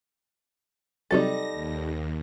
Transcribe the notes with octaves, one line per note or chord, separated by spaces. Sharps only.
C3 F#3 G3 D#4 A4 A6 A#6
D#2